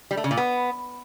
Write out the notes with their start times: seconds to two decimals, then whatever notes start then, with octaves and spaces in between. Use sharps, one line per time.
0.11 G3
0.17 A3
0.24 C#3
0.31 A#2
0.37 B3